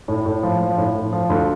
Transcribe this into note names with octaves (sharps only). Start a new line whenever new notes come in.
A2
A2
F3
F3
A2
A2
F3
D2